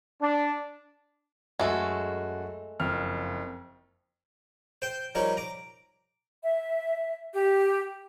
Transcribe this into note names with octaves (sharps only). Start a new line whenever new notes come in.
D4
F#2 G#3 A3 F#4 A4
F#1 F2 F6
C5 G5
F3 G3 D#4 A#4 C#5
A#5 D6
E5
G4